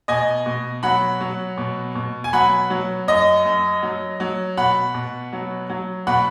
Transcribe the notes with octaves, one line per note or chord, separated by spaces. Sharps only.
B2 D#5 G#5
B2
F#3 F#5 B5
F#3
B2
B2
G#5
F#3 F#5 B5
F#3
F#2 D#5
F#2
F#3
F#3
B2 F#5 B5
B2
F#3
F#3
B2 F#5 B5